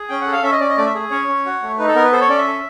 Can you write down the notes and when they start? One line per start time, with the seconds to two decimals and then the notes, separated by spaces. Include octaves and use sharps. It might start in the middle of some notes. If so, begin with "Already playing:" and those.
Already playing: G#4
0.09 C#4 G5
0.21 A4 F#5
0.32 F5
0.43 C#4 E5
0.52 D#5
0.60 C#4 D5
0.69 D#5
0.77 A3 D5
0.86 E5
0.95 G#4
1.11 C#4 C#5
1.27 C#4
1.46 F#4
1.62 A3
1.78 D#4 B4
1.88 A4
1.95 B3 A#4
2.04 B4
2.12 A4 C5
2.21 C#5
2.29 C#4 D5
2.38 E5
2.47 A4